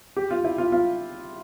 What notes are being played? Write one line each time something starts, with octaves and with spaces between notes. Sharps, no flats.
G4
F4
E4
F4
F4